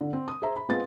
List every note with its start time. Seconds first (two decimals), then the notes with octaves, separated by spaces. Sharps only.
0.01 D3
0.13 C4
0.28 D#6
0.42 G#4 C5 E5 A#5
0.56 B5
0.69 G#3 B3 C4 F4 A6